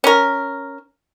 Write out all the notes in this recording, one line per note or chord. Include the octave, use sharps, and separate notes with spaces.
C#4 A#4